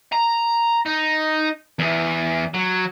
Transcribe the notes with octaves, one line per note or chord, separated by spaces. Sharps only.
A#5
D#4
E2 E3
F#3